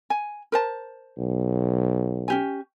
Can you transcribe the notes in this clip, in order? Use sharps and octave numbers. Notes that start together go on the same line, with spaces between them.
G#5
A#4 C5 A5
B1
C#4 G4 G#5